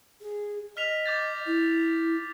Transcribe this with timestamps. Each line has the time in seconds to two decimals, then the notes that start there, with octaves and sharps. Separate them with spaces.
0.21 G#4
0.77 D#5 F6 B6 F7
1.06 D6 G6 A6
1.46 E4